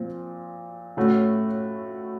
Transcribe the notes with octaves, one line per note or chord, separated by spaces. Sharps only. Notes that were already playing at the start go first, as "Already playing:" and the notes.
Already playing: A#2 F3 C4
A2 A3 C#4 F#4